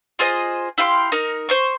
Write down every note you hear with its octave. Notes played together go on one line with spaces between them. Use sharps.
F4 G#4 C5 D#5
E4 G4 F5 C6
D#4 A#4
C5 C6 C#6